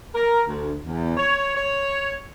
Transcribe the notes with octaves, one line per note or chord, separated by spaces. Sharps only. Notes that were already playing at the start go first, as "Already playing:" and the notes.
A#4
D2
E2
C#5
C#5